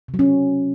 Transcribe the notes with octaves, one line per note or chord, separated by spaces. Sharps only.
C3
F#3
C#4